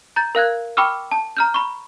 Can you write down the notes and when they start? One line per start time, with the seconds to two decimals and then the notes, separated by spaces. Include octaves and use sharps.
0.16 A#5 G6 A6
0.35 A#4 F5 F#6 G#6
0.77 G5 B5 C#6 D6 E6 F6
1.11 A5
1.37 A#5 F6 G6
1.54 B5 C#6